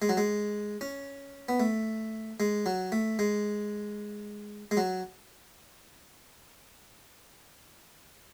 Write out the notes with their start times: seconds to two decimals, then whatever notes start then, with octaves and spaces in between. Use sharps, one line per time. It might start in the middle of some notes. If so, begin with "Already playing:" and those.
0.02 G#3
0.09 F#3
0.17 G#3
0.81 C#4
1.49 B3
1.60 A3
2.40 G#3
2.66 F#3
2.92 A3
3.19 G#3
4.71 G#3
4.77 F#3